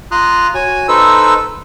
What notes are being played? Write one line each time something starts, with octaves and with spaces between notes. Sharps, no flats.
F4 A#5 C6 D#6 F#6
F#4 C#5 G#5
D#4 A4 B4 C5 E6